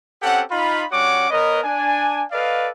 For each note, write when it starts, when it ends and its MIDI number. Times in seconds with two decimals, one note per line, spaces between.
0.22 0.43 60
0.22 0.43 61
0.22 0.43 67
0.22 0.43 69
0.22 0.43 78
0.51 0.84 63
0.51 0.84 65
0.51 0.84 83
0.91 1.26 55
0.91 1.26 61
0.91 1.26 66
0.91 1.26 73
0.91 1.26 78
0.91 1.26 86
1.30 1.59 59
1.30 1.59 70
1.30 1.59 71
1.30 1.59 73
1.30 1.59 75
1.64 2.23 62
1.64 2.23 80
2.31 2.69 69
2.31 2.69 71
2.31 2.69 74
2.31 2.69 75
2.31 2.69 77